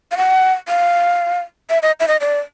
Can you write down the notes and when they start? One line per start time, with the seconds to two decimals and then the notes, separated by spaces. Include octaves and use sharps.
0.11 F5
0.17 F#5
0.68 F5
1.70 E5
1.83 D#5
2.00 E5
2.08 D#5
2.21 D5